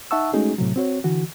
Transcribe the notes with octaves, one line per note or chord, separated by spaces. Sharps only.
D#4 E5 F#5 A5 C#6 E6
G#3 A3 C#4 D#4 F#4 G#4
A2 C3 F#3
C4 F#4 C#5
D3 E3 F#4